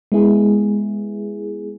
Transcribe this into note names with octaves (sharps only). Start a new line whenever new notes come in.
G#3 B3 E4 G#4